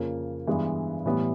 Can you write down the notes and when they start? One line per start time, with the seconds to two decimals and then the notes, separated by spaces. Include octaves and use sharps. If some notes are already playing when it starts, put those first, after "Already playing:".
Already playing: F2 C#3 F3 A#3
0.47 G2 E3 G#3 B3
1.05 A2 E3 G3 B3